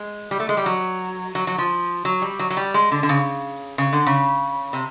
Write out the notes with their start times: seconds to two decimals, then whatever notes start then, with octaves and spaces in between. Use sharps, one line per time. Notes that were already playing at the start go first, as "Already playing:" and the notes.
Already playing: G#3
0.31 G3
0.40 A3
0.49 G#3
0.57 G3
0.66 F#3
1.35 F#3
1.47 F#3
1.58 F3
2.05 F#3
2.22 G3
2.39 F#3
2.50 F#3
2.57 G3
2.74 G#3
2.92 D3
3.03 D3
3.09 C#3
3.78 C#3
3.93 D3
4.07 C#3
4.73 C3